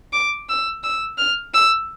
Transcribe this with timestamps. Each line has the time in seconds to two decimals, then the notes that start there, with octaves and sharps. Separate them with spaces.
0.13 D6
0.49 E6
0.84 E6
1.18 F6
1.54 E6